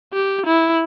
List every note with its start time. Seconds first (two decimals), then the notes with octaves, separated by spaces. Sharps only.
0.13 G4
0.46 E4